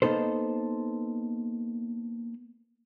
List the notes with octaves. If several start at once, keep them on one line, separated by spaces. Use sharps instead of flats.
A#3 B3 D#4 A4 C5